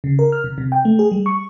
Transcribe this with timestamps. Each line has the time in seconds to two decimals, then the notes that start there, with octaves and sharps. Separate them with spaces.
0.04 C#3
0.19 A#4
0.32 F6
0.44 C3
0.58 C3
0.72 G5
0.85 A3
0.99 G#4
1.12 G3
1.26 C#6